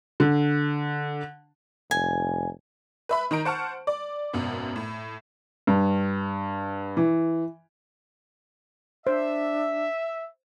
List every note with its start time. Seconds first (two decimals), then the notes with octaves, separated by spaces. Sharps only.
0.20 D3
1.91 F1 G#5
3.09 B4 E5 B5
3.31 D#3 D#4 A#5 D7
3.45 C5 F#5 A5 C#6 F6
3.87 D5
4.33 G#1 F#2 B2
4.76 A2
5.67 G2
6.97 E3
9.07 D4 C5 E5